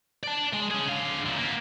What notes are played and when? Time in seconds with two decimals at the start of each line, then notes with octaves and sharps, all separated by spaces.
0.23 D5 A5
0.53 G#3
0.71 C#4 G#4
0.89 D3 F5
1.26 C#2 A#2
1.38 A#3 B3